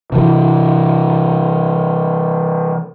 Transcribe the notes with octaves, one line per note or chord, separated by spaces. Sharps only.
C3 E3